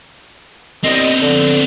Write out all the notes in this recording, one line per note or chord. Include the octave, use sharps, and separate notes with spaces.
C2 B3 C4 D5 D#5
D3 F3